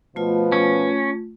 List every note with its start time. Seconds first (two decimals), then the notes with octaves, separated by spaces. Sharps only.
0.16 B2 F3 A3 F4 B4
0.52 C#4